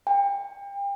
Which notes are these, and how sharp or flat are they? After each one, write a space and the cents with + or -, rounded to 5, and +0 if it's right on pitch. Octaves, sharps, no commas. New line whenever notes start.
G5 +35